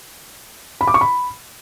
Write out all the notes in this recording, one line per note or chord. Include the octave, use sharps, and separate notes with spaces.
B5
D6
C#6
B5